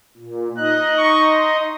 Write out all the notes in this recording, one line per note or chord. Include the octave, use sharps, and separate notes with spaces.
A#2
D#4 D#5 F#6
C#6
C6